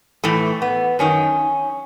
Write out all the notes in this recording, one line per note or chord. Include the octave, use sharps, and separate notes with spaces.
A2 E3 A3
B3
F#2 D#3 C#4